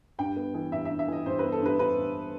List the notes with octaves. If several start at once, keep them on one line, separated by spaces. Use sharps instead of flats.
G2 G5
B3
E3
G2 E5
E5
G2
E5
E3 D#5
G2 C5
B3 B4
A4
G2 B4
G2 B4
G2